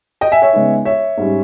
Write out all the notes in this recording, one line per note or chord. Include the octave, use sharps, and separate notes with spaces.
D#5 G5
E5 G#5
C#5 E5
C#3 G#3 B3 D#4
C#5 E5
G#2 G3 C#4